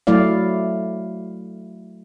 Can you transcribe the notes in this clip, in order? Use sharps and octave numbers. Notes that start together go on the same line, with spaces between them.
F#3 A3 E4 D5 F5